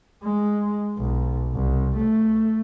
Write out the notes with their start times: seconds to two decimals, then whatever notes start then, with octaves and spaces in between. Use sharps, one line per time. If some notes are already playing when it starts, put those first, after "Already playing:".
0.23 G#3
0.98 B1
1.54 C2
1.96 A3